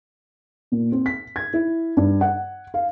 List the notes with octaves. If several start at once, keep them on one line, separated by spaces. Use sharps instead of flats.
A#2
C4
B6
G#6
E4
G2
F#5
F5